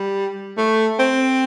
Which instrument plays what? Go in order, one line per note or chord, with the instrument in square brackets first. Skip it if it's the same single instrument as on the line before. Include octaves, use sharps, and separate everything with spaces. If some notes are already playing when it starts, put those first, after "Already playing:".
Already playing: [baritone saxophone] G3
A3
C4